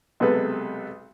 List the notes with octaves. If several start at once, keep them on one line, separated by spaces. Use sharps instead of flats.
B1 C3 G#3 B3 A4 B4